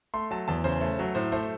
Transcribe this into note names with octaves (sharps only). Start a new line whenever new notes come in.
A3 C6
F#3 A5
E2 A5
C#3 C5
A3
F#3
A2 C5
A3 C5